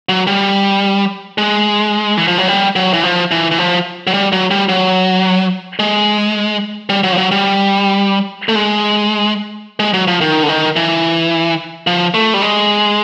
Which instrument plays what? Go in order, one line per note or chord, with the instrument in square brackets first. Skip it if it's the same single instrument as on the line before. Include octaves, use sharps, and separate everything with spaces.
[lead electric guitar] F#3
G3
G#3
E3
F3
F#3
G3
F#3
E3
F3
E3
E3
F3
F#3
G3
F#3
G3
F#3
G#3
G3
F#3
F3
F#3
G3
A3
G#3
G#3
F#3
F3
D#3
D3
D#3
E3
F3
A3
G3
G#3